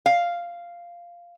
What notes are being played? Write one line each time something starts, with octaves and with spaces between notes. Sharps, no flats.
F5